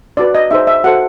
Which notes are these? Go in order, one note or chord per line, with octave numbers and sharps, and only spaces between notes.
D4 F#4 B4 D5
D#5
D#4 G#4 C5 E5
E5
F#4 A4 C5 F#5